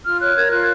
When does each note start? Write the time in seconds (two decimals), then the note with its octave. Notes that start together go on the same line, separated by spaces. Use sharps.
0.05 F4 F6
0.21 C#5 F#6
0.36 A#4 G#6
0.52 F4 F#6